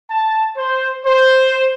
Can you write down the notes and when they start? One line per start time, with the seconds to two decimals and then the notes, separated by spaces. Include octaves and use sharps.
0.11 A5
0.57 C5
1.05 C5